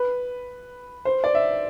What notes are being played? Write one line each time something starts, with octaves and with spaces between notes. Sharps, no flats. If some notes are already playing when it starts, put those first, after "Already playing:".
Already playing: B4
C5
D5
E5